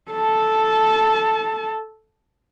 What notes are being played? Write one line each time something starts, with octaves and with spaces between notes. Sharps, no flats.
A4 A5